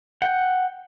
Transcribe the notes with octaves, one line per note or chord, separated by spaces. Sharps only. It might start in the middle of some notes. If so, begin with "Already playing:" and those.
F#5 G5